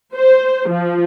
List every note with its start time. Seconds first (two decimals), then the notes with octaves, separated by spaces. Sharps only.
0.15 C5
0.69 F3